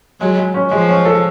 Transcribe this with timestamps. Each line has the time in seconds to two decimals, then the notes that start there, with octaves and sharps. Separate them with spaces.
0.20 F#3 G#3
0.37 G#3
0.54 C#4
0.71 F3 G#3
0.89 C#4
1.05 A4